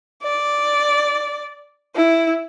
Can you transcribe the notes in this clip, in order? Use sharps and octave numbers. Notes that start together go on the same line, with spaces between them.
D5
E4